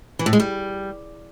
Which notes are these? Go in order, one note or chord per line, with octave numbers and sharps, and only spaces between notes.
E3
A2
G#3
G3